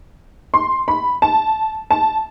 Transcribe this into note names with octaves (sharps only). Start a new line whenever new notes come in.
C6
B5
A5
A5